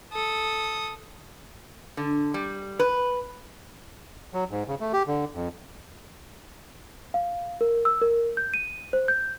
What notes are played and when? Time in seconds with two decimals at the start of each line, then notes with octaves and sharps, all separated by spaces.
0.13 A4 D#6
1.97 D3
2.34 G3
2.79 B4
4.34 F#3
4.51 G#2
4.68 C#3
4.80 A3
4.93 G4
5.07 D3
5.35 F2
7.14 F5
7.61 A#4
7.85 E6
8.02 A#4
8.37 G6
8.54 D#7
8.93 C5
9.08 G6